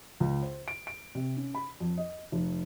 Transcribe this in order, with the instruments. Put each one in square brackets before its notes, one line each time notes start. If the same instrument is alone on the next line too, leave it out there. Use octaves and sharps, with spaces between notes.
[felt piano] C#2
C5
D7
D7
C3
C#4
B5
F2
D#5
F1